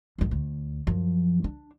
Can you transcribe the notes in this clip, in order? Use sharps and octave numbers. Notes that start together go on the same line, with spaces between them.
A1 F#2
D2
F#2 F3
D4